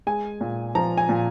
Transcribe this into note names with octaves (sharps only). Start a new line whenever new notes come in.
G#3 G#5
A#2
F3 A#5
G#5
A#2